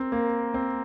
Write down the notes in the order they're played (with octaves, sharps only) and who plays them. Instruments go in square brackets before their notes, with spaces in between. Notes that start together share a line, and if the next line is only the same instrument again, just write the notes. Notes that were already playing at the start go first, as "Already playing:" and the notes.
Already playing: [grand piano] C4 A#4
A#3
C4